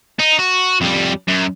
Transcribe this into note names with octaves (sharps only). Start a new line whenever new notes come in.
D#4
F#4
F2 G3
F#2